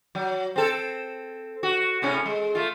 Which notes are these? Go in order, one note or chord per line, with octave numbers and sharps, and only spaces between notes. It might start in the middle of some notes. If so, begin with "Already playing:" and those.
F#3
C4 A4
F#4
A2 C3 C#4
G#3
A3 F4